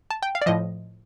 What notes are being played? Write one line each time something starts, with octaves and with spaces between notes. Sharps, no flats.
A5
G5
F5
D5
A2 F3 D#5